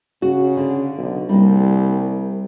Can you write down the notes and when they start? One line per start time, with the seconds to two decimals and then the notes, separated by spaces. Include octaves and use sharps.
0.22 C#3 F#4
0.57 D3
0.98 B1
1.29 C2 G3 A#3